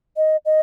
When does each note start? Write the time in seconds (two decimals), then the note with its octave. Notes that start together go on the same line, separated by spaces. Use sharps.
0.17 D#5
0.46 D#5